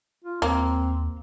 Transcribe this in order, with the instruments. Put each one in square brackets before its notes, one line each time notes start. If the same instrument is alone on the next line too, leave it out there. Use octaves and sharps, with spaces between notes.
[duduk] F4
[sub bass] D#2 [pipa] A#3 [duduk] C4